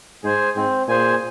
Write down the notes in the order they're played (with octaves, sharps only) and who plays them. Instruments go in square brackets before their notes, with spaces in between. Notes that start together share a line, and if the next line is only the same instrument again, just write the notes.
[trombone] G#2 [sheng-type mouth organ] G#4 C5 G#5
[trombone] G#2 [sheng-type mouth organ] C4
[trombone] A#2 [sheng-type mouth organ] G#4 C5 G#5